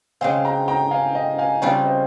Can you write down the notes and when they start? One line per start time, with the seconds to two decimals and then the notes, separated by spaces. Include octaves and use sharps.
0.21 C#3 G#3 C4 F5 G#5
0.45 G5 A#5
0.68 G5 A#5
0.91 F5 G#5
1.15 D#5 G5
1.38 F5 G#5
1.62 C#3 G3 C4 F4 C#5 F5
1.85 C5 D#5